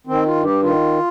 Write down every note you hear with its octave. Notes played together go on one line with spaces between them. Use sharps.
D#3 C4
F4
G2
G4
D#3 F4